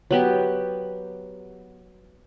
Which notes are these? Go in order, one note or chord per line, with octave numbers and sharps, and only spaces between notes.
F#3 B3 G4